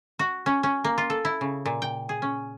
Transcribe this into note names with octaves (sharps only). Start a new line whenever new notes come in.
F#4
C#4
C#4
A#3
F4
A4
E4
C#3
A#2
G5
G#4
C#4